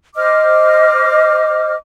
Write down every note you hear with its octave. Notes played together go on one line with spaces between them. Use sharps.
C5 D#5 D6 F6